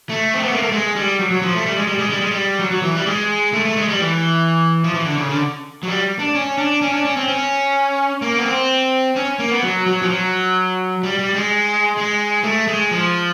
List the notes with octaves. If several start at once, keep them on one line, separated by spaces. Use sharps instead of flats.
A3
C4
B3
A#3
A3
G#3
G3
F#3
F#3
F3
A3
G3
G#3
G3
G#3
G3
G#3
G3
F#3
F#3
E3
G3
G#3
A3
A3
G#3
G3
E3
F3
E3
D3
C#3
D3
F#3
G3
D4
C#4
D4
C#4
D4
C#4
C4
C#4
A#3
B3
C4
C#4
A#3
B3
F#3
F#3
F3
F#3
G3
G3
G#3
G#3
A3
G#3
F3